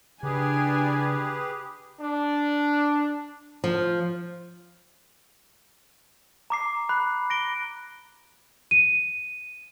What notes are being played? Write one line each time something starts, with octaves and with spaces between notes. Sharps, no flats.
C#3 D4 G4 G#4 B4 G#5
D4
F3
A#5 D6 C7
B5 F#6
A#6 D7 G7
D#7